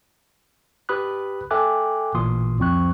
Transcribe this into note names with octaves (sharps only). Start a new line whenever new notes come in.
G4 B4 B5 D#6 F#6
A4 E5 G5 G#5 D6 F#6
A1 A#2 E3 C6 D#6
C2 F2 F3 C4 C#6 F#6